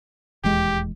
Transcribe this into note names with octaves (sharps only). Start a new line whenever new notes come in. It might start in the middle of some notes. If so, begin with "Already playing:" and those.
D#1 E2 G#3 G4